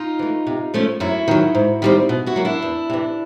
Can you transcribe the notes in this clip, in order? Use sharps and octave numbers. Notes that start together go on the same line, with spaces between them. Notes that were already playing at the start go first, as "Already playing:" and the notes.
Already playing: D#4 F4
E3 A3
C3
F3 A3 C#4
F#2 E4 F#4
D#3 F#3
G#2
D#3 G3 C4
B2
E4 F#4
F#3 A#3
D4 E4
E2
C3 E3